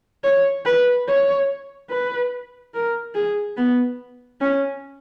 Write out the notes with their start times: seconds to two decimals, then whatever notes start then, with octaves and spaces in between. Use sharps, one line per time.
0.24 C#5
0.65 B4
1.08 C#5
1.90 B4
2.74 A#4
3.15 G#4
3.57 B3
4.41 C#4